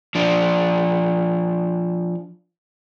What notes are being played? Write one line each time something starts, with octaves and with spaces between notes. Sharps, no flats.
F3 D4